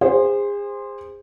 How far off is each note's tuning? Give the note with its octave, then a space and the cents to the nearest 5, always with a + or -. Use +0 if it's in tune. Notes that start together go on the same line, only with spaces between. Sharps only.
G#4 -35 C5 +0